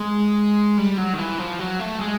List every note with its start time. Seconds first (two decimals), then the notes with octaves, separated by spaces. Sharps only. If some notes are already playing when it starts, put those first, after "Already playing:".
Already playing: G#3
0.78 G3
0.98 F#3
1.14 D#3
1.19 E3
1.39 F3
1.59 F#3
1.79 A3
2.00 G#3